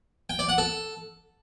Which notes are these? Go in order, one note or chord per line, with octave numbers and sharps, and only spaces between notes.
G5
D5
F#5
A4